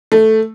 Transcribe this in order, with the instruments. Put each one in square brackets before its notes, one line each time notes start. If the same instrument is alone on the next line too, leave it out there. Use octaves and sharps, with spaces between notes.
[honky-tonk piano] A3